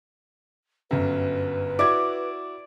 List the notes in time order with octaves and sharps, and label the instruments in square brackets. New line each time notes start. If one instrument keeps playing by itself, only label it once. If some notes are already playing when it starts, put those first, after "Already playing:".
[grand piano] G1 F#2 [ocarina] B4
[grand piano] E4 F#4 G#6 [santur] D5